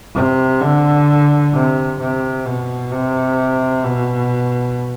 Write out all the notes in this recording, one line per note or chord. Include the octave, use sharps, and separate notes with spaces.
C3
D3
C3
C3
B2
C3
B2